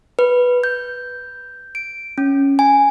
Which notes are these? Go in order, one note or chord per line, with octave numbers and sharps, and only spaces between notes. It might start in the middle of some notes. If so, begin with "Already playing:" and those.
B4
G6
D7
C#4
G#5